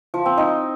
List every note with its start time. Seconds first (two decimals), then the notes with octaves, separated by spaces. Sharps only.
0.14 F3
0.26 C4
0.37 D#4